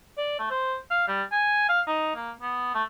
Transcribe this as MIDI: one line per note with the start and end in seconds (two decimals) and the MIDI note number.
0.17 0.37 74
0.39 0.46 57
0.50 0.76 72
0.91 1.05 77
1.08 1.23 55
1.32 1.64 80
1.69 1.81 77
1.87 2.14 63
2.15 2.31 58
2.42 2.72 59
2.74 2.83 57